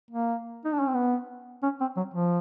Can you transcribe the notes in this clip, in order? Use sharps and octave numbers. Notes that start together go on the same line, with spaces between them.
A#3
D#4
D4
C#4
C4
B3
C#4
C4
F#3
F3